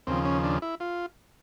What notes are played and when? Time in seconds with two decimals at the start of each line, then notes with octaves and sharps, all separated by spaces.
0.07 D#2 C#3 F3 C4
0.25 C#4
0.44 D4
0.62 E4
0.80 F4